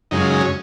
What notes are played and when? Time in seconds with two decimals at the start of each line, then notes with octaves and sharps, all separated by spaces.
0.11 F#2 C#3 G#3 D#4
0.21 F4
0.31 D#4
0.41 C#4